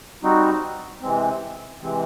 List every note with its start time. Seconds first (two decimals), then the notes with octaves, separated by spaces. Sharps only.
0.23 G3 C4 D#4 F#4
1.02 C3 E3 G#3 C4
1.82 C3 E3 G#3 C4